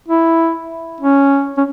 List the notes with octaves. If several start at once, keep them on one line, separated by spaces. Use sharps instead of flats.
E4
C#4
C#4